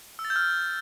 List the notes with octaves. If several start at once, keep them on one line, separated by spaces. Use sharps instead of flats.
E6
A6
G6
F6